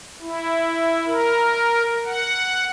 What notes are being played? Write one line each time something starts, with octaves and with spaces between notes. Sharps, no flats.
E4
A#4
F#5